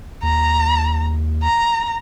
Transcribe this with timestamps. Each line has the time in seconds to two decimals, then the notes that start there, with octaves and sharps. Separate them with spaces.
0.23 D#2 A#5
1.43 A#5